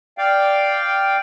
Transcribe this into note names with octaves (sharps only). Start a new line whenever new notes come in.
D5 F5 G5